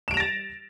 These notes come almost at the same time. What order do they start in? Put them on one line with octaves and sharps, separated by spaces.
E7 D7 F7 A#6 A6